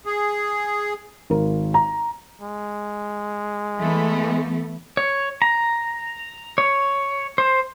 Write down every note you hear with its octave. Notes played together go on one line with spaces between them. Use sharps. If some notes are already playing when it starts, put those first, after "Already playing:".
G#4
G#1 A#4
A#5
G#3
E3 A3 B3
C#5
A#5
C#5
C5